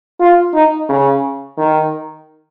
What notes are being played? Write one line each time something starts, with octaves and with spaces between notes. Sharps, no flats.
F4
D#4
C#3
D#3